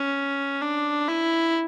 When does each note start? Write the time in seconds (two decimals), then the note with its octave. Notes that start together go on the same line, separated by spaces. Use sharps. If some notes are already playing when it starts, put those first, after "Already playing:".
Already playing: C#4
0.62 D4
1.08 E4